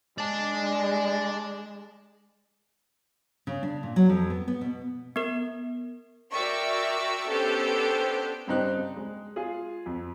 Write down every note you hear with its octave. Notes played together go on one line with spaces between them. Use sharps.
G#3 D5 A5
C#3
D4
A#2
F#3
F2
B3
B3
B2
B3 A#4
F#4 A#4 D5 E5 G5 C#6
B3 C#4 D4 G4 A4 C5
G2 C#3 C4 D#4 G4 F#6
G#3
F4 G#4
F2